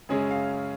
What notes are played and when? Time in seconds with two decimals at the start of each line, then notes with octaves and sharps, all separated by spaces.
0.09 F#2 C#3 G#3 C#4 G#4
0.31 F5